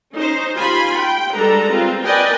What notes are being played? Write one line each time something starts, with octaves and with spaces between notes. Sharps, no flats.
C#4 D#4 C5
F4 G4 G#5 B5 C6
G5
G3 G#3 D4 A4 B4 A#5
C4 F4
A#4 B4 D5 D#5 G5 G#5